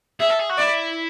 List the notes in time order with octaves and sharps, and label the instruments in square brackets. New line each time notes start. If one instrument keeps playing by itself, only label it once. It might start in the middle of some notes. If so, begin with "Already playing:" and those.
[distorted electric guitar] G#4 [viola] E5
[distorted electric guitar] A4
G#4
F#4
[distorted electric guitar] E4 [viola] D5